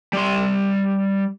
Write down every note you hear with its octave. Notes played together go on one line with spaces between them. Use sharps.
G3 C6